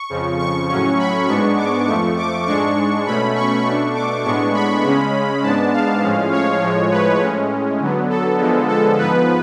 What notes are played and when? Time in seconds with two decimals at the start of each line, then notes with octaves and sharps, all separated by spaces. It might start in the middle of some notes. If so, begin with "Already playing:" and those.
Already playing: C#6
0.10 F2 C#3 F3
0.39 C#6
0.69 A2 F#3 C#4 C#6
0.99 B5
1.28 G#2 G#3 B3 D4 C#6
1.58 D6
1.87 F2 F3 A3 C#6
2.17 D6
2.47 G#2 G#3 D4 C#6
3.06 B2 A3 C#4 B5
3.35 C#6
3.65 B2 A3 D4 C#6
3.95 D6
4.24 A2 G#3 B3 D4 C#6
4.54 B5
4.84 C#3 G#3 C#4
5.43 G#2 G#3 B3 D4 A5
5.73 F5
6.02 A2 F3 G#3 C#4
6.32 C#5
6.62 A2 F3 G#3
6.91 B4
7.21 A2 G#3 C#4
7.80 D3 F#3 B3
8.10 A4
8.39 D3 F3 G#3 B3
8.69 A4
8.98 G#2 F3 B3 B4